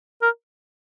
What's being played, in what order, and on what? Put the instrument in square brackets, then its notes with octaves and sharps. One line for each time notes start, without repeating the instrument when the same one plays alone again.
[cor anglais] A#4